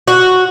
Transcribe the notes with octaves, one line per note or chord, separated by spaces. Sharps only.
F#4